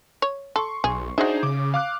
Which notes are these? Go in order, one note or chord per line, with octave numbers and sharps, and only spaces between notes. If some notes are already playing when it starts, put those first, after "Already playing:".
C#5
A4 C6 C#6
B1 G#4
D4 D#4 F#4 G#4 C5 E5
C#3 D6
F5 D6 F#6